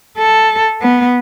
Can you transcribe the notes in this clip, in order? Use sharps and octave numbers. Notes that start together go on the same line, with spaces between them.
A4
B3